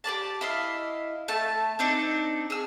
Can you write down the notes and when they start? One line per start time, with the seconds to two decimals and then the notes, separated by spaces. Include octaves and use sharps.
0.04 G4 B4 D5 A5
0.41 E4 D#5 F5
1.28 A3 A5
1.79 C4 D4 D#4
2.50 G#4 E6